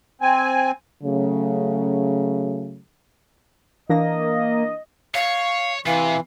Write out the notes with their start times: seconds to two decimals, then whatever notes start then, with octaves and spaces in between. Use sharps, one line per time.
0.22 C4 G#5
1.03 C#3 F#3 A3
3.89 E3 A#3 D4 D#5 A#6
5.14 C#5 F5
5.86 C3 E3 F5